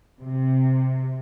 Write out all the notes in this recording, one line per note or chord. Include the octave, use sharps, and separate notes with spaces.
C3